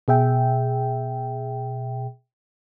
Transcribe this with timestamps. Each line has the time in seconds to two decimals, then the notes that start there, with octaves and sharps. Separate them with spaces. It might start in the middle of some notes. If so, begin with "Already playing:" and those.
0.08 B2 G#4 E5 G5